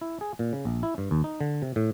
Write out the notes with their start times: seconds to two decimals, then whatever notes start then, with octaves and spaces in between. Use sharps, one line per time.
0.01 E4
0.21 G#4
0.39 A#2
0.53 C#3
0.65 A#1
0.83 E4
0.98 G2
1.11 D#2
1.24 D#4
1.41 D3
1.62 C3
1.76 A2